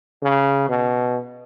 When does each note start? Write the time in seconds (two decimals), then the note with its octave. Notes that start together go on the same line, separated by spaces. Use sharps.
0.23 C#3
0.69 B2